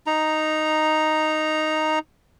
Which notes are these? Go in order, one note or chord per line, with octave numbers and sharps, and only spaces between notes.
D#4 A#5